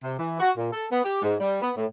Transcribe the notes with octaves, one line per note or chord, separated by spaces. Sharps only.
C3
E3
F#4
A#2
A4
B3
G4
G#2
G3
B3
A2